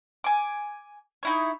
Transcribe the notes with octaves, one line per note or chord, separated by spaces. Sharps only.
G#5 D6
D#4 E4 C#5